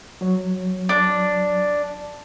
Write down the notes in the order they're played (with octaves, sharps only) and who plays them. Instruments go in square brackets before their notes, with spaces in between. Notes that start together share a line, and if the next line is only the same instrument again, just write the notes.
[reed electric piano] F#3 C#5
[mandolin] D4